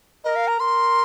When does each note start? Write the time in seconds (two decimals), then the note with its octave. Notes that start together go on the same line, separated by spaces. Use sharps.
0.24 A#4 D#5
0.36 F5
0.48 A#5
0.60 A#4 C6